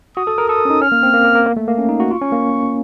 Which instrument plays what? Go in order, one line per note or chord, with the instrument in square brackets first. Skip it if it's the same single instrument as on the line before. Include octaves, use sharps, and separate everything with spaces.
[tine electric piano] F#4 [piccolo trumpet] D#6
[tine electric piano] A4
A#4
[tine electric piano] A4 [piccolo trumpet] D#6
[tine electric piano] C#4
D#4
[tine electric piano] C#4 [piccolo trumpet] F6
[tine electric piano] A#3
C4
A#3
A#3
A#3
A#3
A3
A#3
C#4
D#4
F#4
[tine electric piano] F4 [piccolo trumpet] C#6
[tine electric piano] C#4
A#3